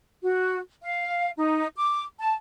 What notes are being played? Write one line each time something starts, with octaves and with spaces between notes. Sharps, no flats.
F#4
F5
D#4
D6
A5